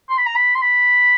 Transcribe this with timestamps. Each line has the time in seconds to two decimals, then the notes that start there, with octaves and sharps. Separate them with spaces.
0.09 C6
0.18 B5
0.26 A#5
0.35 B5
0.55 C6
0.62 B5